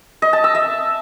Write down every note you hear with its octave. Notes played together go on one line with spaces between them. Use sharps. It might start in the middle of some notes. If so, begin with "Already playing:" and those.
D#5
A5
E6
E5